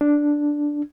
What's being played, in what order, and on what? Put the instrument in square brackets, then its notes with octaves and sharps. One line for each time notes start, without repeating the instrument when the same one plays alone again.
[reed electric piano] D4